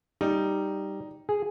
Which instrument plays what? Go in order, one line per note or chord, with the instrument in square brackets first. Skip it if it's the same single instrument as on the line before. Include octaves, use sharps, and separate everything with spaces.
[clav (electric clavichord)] G3 [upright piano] D#4
[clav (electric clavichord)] G#4